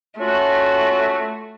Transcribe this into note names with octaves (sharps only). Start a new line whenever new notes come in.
A3 C#4 F4 F#4